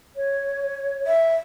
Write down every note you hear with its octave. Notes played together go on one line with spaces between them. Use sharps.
C#5
E5